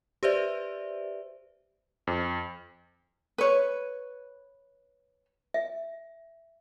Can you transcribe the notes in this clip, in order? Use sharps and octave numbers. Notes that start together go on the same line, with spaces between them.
G4 B4 C5 D5 E5
F2
B4 C#5
E5